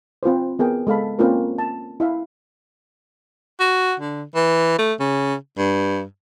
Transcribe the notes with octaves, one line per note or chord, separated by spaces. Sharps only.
C4 F4 B4 C5
B3 G#4 A#4 G5
G#3 A4 F5 B5
A#3 C4 C#4 F4 A#4 B4
A5
E4 E5 F5
F#4
D3
E3
A3
C#3
G2